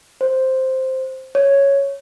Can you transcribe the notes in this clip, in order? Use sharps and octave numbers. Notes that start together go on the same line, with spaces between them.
C5
C#5